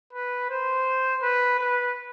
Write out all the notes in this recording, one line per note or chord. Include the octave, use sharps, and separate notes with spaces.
B4
C5
B4
B4